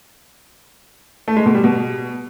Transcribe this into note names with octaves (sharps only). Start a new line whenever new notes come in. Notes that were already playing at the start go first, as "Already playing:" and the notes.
A3
G#3
B2
G3
B2